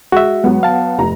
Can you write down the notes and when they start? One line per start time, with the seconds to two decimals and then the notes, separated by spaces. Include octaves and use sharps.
0.12 G#3 F#4 E5
0.44 F#3 G#3 B3
0.63 F5 A5
0.98 F1 A#5